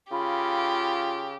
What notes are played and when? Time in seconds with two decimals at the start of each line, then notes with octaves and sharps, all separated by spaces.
0.12 C#3 F4 G4 B5